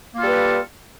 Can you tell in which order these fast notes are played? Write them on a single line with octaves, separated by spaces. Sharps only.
A#3 F4 A4 G3 B4